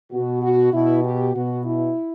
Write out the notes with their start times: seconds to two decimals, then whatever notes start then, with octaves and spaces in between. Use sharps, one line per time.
0.12 B2 F#4
0.42 F#4
0.72 B2 E4
1.04 G4
1.34 B2 F#4
1.65 E4